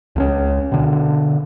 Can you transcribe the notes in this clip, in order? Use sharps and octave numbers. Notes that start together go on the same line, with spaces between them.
C#2 A3 C#4
B2 D3